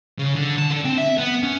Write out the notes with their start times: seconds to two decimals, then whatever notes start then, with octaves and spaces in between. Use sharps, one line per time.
0.19 C#3
0.35 D3
0.58 A5
0.70 D3
0.85 C4
0.98 E5
1.18 B3
1.43 C#4